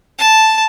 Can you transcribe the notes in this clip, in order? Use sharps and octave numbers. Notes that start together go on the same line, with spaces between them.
A5